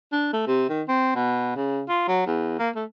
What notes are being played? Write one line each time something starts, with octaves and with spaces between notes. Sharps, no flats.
D4
A3
C3
D#3
C4
B2
C#3
F4
F#3
E2
A#3
A3